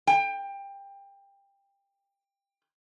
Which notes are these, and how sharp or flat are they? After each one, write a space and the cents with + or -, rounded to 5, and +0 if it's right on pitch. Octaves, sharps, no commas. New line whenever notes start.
G5 +20